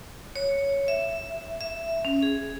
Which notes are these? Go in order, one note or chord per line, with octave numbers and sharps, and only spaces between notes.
C#5
E5
E5
C#4
G#4